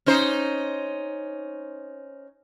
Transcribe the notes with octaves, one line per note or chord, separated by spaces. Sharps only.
C#4 D#4 C5